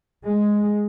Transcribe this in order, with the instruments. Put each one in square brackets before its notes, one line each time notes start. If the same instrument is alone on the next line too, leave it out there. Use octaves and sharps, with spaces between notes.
[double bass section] G#3